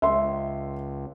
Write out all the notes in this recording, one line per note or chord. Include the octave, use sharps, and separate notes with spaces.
C#2 E5 C6